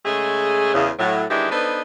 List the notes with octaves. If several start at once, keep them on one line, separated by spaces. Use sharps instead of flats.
C#3 G#3 A3 G#4
E2 C#3
A2 F#3
D#3 E3 G#3 D4 E4 G4
B3 D4 D#4 A4 B4 C5